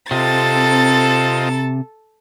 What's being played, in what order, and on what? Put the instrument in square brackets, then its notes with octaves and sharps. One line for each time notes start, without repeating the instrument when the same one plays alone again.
[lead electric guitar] C3 [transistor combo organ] C4 F4 D#5 [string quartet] A4 A6